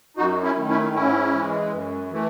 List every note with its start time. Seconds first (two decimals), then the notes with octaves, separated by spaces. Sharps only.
0.17 F#2 D#4 F#4
0.43 C#4 E4
0.57 D#3 A3
0.69 C#4 E4
0.95 G#2 C#4 E4
1.34 E3 G#3
1.73 F#2
2.12 E3 A3